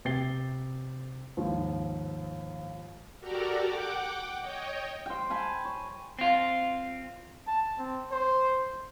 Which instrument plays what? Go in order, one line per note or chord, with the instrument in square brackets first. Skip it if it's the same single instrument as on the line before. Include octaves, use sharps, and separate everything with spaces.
[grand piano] C3 G5 A6 C7 G7
D#2 G#2 F3
[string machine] F#4 G4 A4 A#4 D5 A#5
F#5 G5 D6
C#5 D#5 G5
[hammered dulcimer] C5 G5
G#5 A5 B5
C#5
[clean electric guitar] C4 F4
[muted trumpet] A5
C4
C5